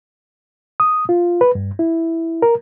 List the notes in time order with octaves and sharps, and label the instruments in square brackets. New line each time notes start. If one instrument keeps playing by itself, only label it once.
[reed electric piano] D#6
F4
B4
G2
E4
A#4